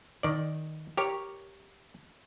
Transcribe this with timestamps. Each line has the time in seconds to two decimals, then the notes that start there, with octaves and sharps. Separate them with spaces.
0.23 D#3 D5
0.97 G4 A#4 C#5